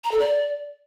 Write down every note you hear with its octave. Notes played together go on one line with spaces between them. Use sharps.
A#5
A4
D5